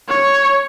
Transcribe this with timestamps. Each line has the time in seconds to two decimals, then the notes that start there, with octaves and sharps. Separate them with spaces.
0.09 C#5